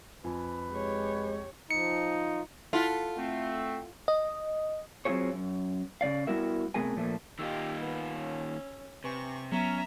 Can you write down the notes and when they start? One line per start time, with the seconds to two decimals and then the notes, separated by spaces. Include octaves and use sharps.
0.24 F2 B4 G#5
0.72 G#3 G4 C#5
1.71 F3 D#4 C#7
2.73 E4 F4 A4 F#5 B6
3.17 A3 C4
4.08 D#5
5.05 F#3 C4 D#4 F4 G#4 C#5
5.33 F#2
6.01 C#3 A3 D5 F5
6.27 G3 B3 E4 F#4 A#4 E5
6.74 C3 A3 B3 G#4 A#4 G#5
6.96 A#2 F3 A3 A#3
7.39 D#3 A#3 F4 G4 D#5 E6
7.80 B3
8.17 C#4
9.04 C3 B4 G#5 C#6
9.51 F#3 B3 C#4 E5 A#5